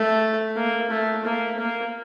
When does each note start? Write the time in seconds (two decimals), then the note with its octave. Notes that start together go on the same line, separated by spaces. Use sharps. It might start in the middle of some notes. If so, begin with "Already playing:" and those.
Already playing: A3
0.56 A#3
0.90 A3
1.24 A#3
1.57 A#3